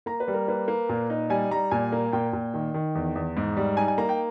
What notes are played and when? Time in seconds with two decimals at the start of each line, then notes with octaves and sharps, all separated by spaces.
0.06 A#3 A#5
0.20 B4
0.28 G3
0.34 A#4
0.48 A#3 B4
0.68 A#3
0.89 A#2
1.10 D#4
1.30 G3 G#5
1.51 G3 A#5
1.71 A#2 G#5
1.92 A#3
2.12 A#2 G5
2.33 A#2
2.54 D#3
2.74 D#3
2.95 E2
3.16 E2
3.37 G#2
3.57 G3
3.77 D#4 G#5
3.88 G#5
3.98 A#3 A#5
4.09 G5